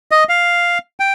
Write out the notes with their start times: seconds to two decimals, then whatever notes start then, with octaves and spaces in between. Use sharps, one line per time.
0.11 D#5
0.29 F5
1.00 G5